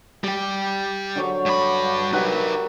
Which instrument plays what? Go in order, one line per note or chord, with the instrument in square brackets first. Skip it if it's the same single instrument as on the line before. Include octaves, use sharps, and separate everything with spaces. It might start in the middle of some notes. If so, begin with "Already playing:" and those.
[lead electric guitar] G3 G4
[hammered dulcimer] D3 F#3 C#5
[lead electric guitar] G2 B5
[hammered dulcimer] G3 A#4 F#5 [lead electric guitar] D#4 B4